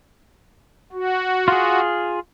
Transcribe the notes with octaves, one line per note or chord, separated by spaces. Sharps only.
F#4
F4 G#4